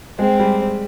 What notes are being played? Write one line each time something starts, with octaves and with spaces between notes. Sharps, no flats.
G#3 C4
G3